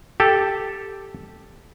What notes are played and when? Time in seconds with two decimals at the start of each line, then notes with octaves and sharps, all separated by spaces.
0.20 G4 A4